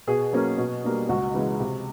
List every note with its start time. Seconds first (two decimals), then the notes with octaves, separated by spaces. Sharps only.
0.07 B2 G#4
0.33 F#3 A#3 C#4
0.58 B2
0.84 G3 A#3 D4
1.09 C#2 F#4
1.34 C#3 E3 G#3
1.60 C3